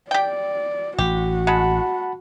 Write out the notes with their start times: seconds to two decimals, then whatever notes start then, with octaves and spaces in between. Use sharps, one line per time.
0.11 G4 D5 G5
0.98 A1 F#4 G4
1.47 G#3 F#5 A5 B5